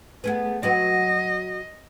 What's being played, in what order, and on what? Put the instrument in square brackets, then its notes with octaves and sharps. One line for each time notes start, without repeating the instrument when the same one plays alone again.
[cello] A3 [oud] B3 G#4 B4
[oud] F#3 F#4 B4 [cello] D#5